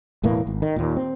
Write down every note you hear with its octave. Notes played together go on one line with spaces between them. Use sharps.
E1 A2 E3 A#3
G#1
D#3
D#2 A#2
C4